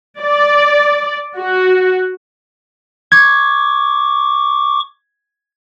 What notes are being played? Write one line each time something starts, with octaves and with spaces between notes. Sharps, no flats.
D5
F#4
C#6 D6 G#6